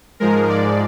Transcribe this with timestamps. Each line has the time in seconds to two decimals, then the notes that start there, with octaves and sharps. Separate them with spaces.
0.20 G#2 F3 G#3 A#4
0.49 D5